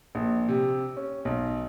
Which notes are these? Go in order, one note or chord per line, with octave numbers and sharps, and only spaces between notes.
A#1
C3
C#4
B1